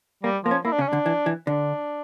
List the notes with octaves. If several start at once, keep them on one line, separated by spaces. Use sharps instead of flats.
G3 A#3
F3 A#3
C#4
A#3 E4
D4
C#3 C#4
D3 D4
E3
E3
D3 D4